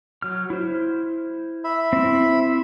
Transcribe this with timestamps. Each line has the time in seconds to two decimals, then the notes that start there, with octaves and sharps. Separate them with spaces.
0.22 F#3 F6
0.50 E4 C5
1.64 E5 B5
1.93 C4 E4